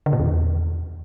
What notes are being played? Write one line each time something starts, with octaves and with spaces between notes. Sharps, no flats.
D3
A#2
E2